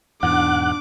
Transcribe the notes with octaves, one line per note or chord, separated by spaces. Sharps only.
E2 G#2 B2 D4 F#5 D6